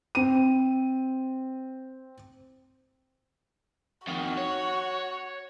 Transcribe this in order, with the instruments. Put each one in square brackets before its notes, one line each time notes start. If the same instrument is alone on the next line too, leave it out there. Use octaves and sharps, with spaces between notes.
[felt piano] C4 D#7
[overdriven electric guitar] F2 D#3 [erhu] F#4
[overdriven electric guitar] C#5